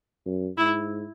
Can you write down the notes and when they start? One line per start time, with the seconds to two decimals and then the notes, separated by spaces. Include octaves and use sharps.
0.26 F#2
0.58 G#2 E4